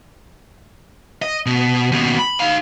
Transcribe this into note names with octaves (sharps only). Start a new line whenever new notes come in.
D#5
B2
D#2 B2
B5
D#4 F5